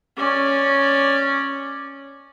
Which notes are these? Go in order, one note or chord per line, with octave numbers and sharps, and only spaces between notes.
C#4 D5